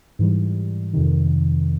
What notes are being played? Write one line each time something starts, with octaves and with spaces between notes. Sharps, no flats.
G#2 E3 G3
F2 C3 D#3